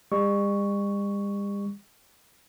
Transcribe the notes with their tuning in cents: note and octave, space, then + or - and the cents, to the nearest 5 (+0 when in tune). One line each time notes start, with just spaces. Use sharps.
G3 +45 C#6 +5